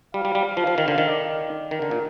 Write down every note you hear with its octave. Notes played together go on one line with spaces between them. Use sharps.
G3 F5
G3
G3
F5
F3
F3
D#3
D3
D#3
D5
D#3 A#4
D3
A#2